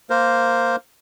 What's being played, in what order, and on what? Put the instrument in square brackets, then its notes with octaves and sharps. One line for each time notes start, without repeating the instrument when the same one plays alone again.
[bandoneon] A#3 A#4 C5